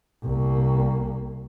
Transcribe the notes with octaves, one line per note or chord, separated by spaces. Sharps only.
C2 A#3